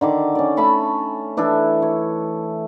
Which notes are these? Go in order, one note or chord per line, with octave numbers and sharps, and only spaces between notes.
D3 D#3 D6
C#4 D5
A3 A5 B5 C#6
E3 D4 E4 A4
C#5